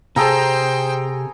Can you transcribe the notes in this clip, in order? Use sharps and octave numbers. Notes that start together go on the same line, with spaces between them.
C3 G#4 A4 C5 G5 A#5